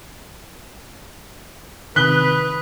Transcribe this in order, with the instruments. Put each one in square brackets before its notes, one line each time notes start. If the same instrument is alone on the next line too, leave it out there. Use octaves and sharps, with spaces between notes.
[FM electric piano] C3 D#3 [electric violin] B4 [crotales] D#6 B6 [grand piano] F#6 G7